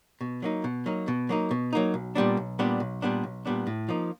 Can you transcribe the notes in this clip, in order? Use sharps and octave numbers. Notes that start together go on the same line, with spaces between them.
B2
F#3 A#3 D#4
B2
F#3 A#3 D#4
B2
F#3 A#3 D#4
B2
F#3 A#3 D#4
B1
A#2 G3 B3 D4
B1
A#2 G3 B3 D4
B1
A#2 G3 B3 D4
B1
A#2 G3 B3 D4
A2
F3 A#3 D#4